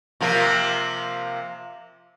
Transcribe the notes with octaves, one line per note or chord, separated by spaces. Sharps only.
C3 F3 A#3